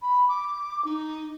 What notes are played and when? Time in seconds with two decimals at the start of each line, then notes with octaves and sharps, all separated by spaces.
0.01 B5
0.28 D6
0.84 D#4